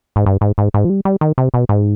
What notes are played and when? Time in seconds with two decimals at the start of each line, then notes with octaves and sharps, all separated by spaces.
0.16 G#2
0.26 G2
0.41 G#2
0.58 G#2
0.74 G#2
0.85 F3
0.90 G3
1.05 G3
1.21 D#3
1.38 C3
1.54 B2
1.69 G#2